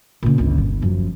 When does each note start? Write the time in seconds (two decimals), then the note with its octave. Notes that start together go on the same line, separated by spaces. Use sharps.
0.23 A#2 C#3
0.38 G1 C#2
0.58 G1
0.82 F#2 F3